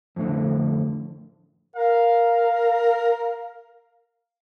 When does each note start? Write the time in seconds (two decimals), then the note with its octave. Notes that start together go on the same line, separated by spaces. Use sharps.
0.16 F2 A2 D3
1.76 A#4 F5